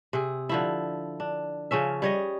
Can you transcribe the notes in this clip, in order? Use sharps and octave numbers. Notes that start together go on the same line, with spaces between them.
C3 G#4
D3 F3 E4
D4
C#3 F3 C#4 E5
G3 C#5 D#5